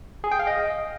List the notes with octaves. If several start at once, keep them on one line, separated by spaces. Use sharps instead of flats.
G#4
G5
F5
D#5